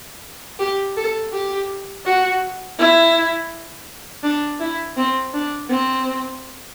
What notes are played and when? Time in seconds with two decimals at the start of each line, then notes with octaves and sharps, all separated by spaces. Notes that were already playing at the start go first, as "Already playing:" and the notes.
0.59 G4
0.97 A4
1.33 G4
2.05 F#4
2.79 E4
4.23 D4
4.60 E4
4.97 C4
5.34 D4
5.70 C4